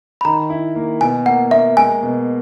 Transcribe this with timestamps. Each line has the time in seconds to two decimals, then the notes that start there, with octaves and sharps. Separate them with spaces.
0.21 B5
0.25 D#3 A#5
0.50 E4
0.76 A#3
1.01 B2 G#5
1.26 A#3 F#5
1.51 A#3 E5
1.77 G#3 G#5
2.03 B2